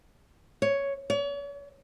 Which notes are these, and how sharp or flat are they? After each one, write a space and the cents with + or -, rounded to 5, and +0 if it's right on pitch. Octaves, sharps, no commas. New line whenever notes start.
C#5 +5
C#5 +40